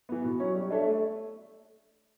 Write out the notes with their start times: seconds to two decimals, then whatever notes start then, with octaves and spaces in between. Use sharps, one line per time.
0.09 E3 B3
0.24 B2
0.40 F#3 C#4
0.55 G3
0.70 D4 A4 C#5 E5
0.87 A3